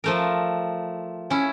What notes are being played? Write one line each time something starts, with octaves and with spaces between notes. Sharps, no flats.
F3 A3 A#4
C#4 E4